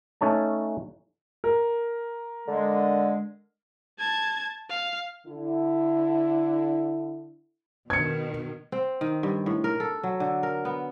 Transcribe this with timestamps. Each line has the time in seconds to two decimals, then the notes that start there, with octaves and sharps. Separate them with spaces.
0.21 A3 C#4 D#4 C#5 A5
1.44 A#4
2.48 D3 G#3
3.99 A5 G#6
4.70 F5
5.27 D3 E4
7.90 B2 D#3 G#6 C#7
8.72 C4
9.01 D#3
9.23 G2
9.46 A2
9.64 A#4
9.80 A4
10.03 F#3
10.20 D3
10.43 A#4
10.65 B3